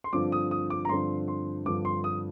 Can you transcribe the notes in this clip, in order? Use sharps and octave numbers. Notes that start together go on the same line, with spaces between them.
C6
G2 D3 F3 C4 D6
D#6
D#6
D6
A#5
G2 D3 F3 C4 C6
C6
G2 D3 F3 C4 D6
C6
D#6